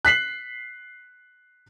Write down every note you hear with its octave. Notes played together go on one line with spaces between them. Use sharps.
F#6 B6 C7 F#7